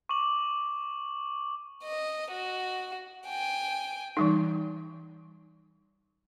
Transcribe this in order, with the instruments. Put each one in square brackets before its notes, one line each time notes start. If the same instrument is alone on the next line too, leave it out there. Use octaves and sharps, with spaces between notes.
[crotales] C#6 D6 F#7
[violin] D#5
F#4
G5 G#5
[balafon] E3 G3 D#4